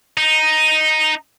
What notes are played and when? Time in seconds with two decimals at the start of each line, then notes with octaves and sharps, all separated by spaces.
0.17 D#4